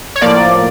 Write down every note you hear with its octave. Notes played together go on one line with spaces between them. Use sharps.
C#5
A2 F3 A#3 D5